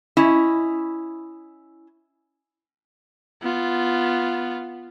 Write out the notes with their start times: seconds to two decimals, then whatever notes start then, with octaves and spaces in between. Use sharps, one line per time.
0.17 C#4 E4 D#5
3.43 B3 F4